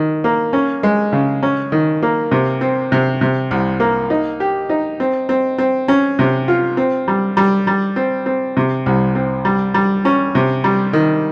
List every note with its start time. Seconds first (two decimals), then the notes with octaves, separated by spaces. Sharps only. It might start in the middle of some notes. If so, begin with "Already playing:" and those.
Already playing: D#3
0.24 A#3
0.53 C#4
0.83 G#3
1.13 C#3
1.43 C#4
1.72 D#3
2.02 A#3
2.31 C3
2.61 C4
2.92 C3
3.21 C3
3.51 C2
3.80 A#3
4.10 D#4
4.40 G4
4.69 D#4
5.00 C4
5.29 C4
5.58 C4
5.88 C#4
6.19 C3
6.48 F4
6.77 C4
7.08 G3
7.37 G3
7.67 G3
7.96 C4
8.26 C4
8.57 C3
8.86 C2
9.15 C4
9.45 G3
9.74 G3
10.05 C#4
10.35 C3
10.64 G3
10.93 D#3